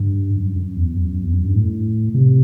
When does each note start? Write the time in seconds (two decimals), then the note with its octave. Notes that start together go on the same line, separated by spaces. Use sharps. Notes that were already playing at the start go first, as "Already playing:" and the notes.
Already playing: G2
0.37 F#2
0.56 F#2
0.76 E2
0.97 F#2
1.24 E2
1.34 F#2
1.44 G2
1.56 A2
2.14 C3